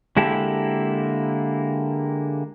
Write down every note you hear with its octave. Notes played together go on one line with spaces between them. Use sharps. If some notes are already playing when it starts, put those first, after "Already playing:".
D3 G#3 A#3 E4 G4 A4